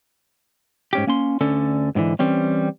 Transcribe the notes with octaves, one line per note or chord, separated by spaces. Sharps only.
G#2 C#4 G4
A#3 C#4 C6
D2 D3 C#4 A4
G#2 B2 D3 E3
E3 G3 C4 C#4